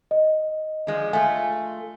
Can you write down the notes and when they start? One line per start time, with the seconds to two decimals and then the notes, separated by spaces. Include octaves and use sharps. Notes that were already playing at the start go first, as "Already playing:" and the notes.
0.11 D#5
0.87 F3 G#3 D4
1.13 A3 F4 G#5